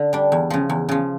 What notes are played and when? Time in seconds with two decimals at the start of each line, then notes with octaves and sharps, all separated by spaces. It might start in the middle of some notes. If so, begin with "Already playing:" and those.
Already playing: D3
0.13 G3 D4
0.32 E2
0.50 C#3 F3
0.70 E2
0.89 C#3 F3